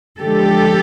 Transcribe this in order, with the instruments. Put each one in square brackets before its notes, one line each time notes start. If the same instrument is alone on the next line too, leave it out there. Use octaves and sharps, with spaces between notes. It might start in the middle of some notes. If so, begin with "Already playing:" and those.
[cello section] D3 F3 G#3 G4 A4